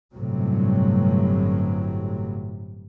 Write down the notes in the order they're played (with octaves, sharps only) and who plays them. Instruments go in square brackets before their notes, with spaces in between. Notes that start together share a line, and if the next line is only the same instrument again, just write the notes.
[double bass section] G1 A2 C3 F#3